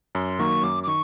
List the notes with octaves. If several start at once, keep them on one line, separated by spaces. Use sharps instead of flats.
F#2 C6
D#3 F#3 A#3 C#6
F#2 D6
D6
D#3 C#6